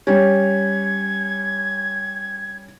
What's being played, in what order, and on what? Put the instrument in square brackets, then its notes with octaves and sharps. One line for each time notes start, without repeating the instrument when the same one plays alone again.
[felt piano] G3 C#4 [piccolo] G#6